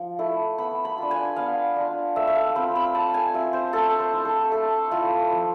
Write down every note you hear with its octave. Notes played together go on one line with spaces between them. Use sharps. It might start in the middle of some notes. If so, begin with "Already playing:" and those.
Already playing: F3
A3 E4
B3 B5
B5
D4 F4
G#5
B3 F5
D4 F4
A3 E5
E5
F5
C4 F4 B5
B5
A3 A5
G#5
C4 F4 E5
C5
A3 A4
C5
E4
A4
A3 A4
E4 F4
F3